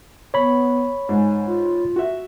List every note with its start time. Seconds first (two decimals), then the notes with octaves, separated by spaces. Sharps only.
0.34 B3 C#5 B5
1.09 G#2 G#5
1.46 F4
1.96 F#4 E5